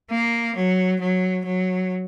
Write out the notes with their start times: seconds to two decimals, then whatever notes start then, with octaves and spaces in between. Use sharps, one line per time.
0.11 A#3
0.56 F#3
1.00 F#3
1.45 F#3